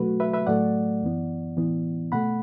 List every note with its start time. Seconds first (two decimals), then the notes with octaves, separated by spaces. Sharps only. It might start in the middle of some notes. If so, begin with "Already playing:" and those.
Already playing: B2 F#3 A3 F#4 B4
0.20 B4 E5
0.34 B4 E5
0.47 A2 F#3 A3 D5 F#5
1.03 F#2 E3 B3
1.57 A2 E3 B3
2.12 B2 A3 F#5 B5